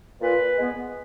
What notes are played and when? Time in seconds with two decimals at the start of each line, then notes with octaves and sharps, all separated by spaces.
0.21 A#2 B4
0.58 G#3 B3